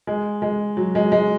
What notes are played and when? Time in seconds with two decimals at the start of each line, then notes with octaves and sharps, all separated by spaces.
0.07 G#3
0.42 G#3
0.77 F#3
0.95 G#3
1.12 G#3